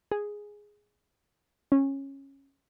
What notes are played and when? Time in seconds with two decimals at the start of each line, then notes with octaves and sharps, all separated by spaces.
0.11 G#4
1.72 C#4